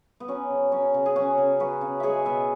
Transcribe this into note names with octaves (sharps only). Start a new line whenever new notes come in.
B3
F#3 C#4
C#3
F#3 C#4
C#3
G#4
F#3 C#4 F#4
C#3
F#3 F#4 B4
C#3
G#3 G#4 C#5 E5
B2 B4 E5